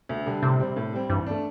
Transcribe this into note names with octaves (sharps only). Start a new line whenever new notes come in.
D2
D3 G3
A2 C3
G3 C4
A2
G3 C4
G2 E3
A3 D4